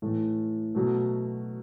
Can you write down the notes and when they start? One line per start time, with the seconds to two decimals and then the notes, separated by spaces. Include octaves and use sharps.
0.02 A2 E3 A3
0.75 B2 F#3 A3